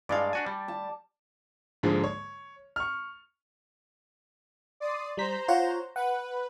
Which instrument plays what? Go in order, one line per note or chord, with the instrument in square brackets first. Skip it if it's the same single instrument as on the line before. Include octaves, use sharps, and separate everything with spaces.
[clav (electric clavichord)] G2 G#3 F5 [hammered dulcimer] D5 A5
[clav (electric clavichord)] D4 F#4 G#5
G3
[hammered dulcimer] A5
[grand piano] G#2 D3 F3 G#3 A#3
C#5
C#6 F6
[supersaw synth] D5 C6 D#6
[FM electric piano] G3 B6 [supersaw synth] C5 A#5 G6
[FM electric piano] F4 C#5 F#5
[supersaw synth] B4 [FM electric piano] F#5